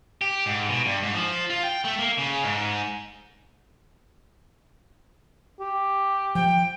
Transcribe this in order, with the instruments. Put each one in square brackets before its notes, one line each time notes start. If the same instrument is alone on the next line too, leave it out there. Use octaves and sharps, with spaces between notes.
[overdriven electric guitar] G4
G#2
B2
G2
G#2
F3
F4
G5
A3
A#3
C#3
G#2
[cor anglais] G4
[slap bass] F3 [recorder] G5